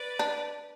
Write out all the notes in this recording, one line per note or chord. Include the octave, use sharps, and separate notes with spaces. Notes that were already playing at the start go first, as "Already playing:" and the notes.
Already playing: B4 D5
D4